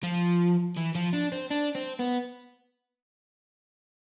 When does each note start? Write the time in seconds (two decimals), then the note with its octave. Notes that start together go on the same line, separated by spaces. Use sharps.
0.03 F3
0.77 E3
0.95 F3
1.14 D4
1.32 C4
1.50 D4
1.75 C4
1.99 B3